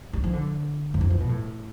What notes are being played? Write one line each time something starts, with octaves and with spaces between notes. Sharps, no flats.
G3
F3
D3
E2
F2
E3
B2
A2